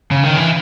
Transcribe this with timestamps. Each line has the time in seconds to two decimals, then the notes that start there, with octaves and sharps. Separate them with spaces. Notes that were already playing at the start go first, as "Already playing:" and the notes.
0.11 C#3
0.24 D#3
0.37 E3